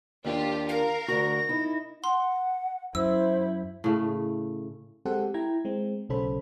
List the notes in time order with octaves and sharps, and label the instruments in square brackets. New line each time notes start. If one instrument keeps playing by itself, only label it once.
[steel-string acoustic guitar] D#2 D4 D5 [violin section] F4 G4
[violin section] A#4 [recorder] F5
[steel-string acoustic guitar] D2 F#4 [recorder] A#6
[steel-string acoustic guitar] D#4 E4
[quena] F#5 [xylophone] C6
[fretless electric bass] F#2 [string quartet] E4 [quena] C5 [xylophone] E6
[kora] A2 C#3 A3
[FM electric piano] G#3 C4 G4 A4 C5 F#5
E4 G5 A#5 G#6
G#3 C4
B1 C#3 C#4 A4 C5 B5